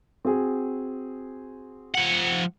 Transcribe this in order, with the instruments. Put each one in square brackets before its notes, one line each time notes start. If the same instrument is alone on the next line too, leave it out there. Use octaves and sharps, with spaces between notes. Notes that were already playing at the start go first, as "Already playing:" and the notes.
[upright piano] C4 F#4 G#4
[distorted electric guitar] F3 F#5